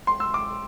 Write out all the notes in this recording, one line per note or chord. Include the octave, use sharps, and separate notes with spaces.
C6
E6
D6